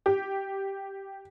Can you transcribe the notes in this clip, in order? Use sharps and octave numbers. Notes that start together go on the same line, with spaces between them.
G4